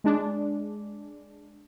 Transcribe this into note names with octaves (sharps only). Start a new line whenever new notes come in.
G#3 D4